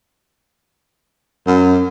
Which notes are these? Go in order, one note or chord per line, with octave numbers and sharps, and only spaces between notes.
F#2